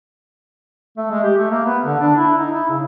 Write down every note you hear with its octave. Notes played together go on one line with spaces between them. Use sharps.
A3
G#3
G4
A3
A#3
B3
D3
D4
E4
D#4
E4
C#3